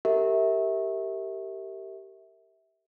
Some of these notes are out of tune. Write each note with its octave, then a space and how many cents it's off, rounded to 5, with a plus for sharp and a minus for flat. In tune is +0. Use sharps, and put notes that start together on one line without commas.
G4 -10 A#4 -25 E5 -20